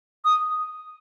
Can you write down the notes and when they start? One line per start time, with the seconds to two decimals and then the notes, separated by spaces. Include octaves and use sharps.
0.25 D#6